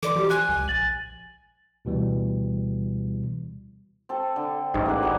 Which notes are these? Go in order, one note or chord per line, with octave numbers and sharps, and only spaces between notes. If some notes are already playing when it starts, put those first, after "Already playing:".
E3 A4 D5 C6 D6
F3 F#4 G4
G#5 F#6
C#2
A#1 A6 F#7
D2 B2 E3 G3
C4 A4
D3
A1 G#2
A#3 F#5
G3 F#4 G#4